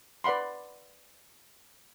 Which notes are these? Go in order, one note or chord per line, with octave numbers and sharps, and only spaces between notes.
B4 D5 F#5 B5 C6